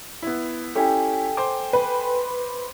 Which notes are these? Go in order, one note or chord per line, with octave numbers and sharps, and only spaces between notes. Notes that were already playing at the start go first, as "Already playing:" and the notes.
B3 E4
C#4 E4 G4 A4 G5 G#5
C5 D6
B4